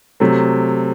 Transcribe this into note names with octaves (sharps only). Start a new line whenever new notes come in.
C3 F#3 A3